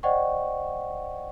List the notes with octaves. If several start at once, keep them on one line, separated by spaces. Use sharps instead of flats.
C5 D5 D#5 F#5 G5 C#6